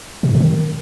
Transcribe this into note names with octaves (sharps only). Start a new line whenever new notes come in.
B2
G#2
B2
D#3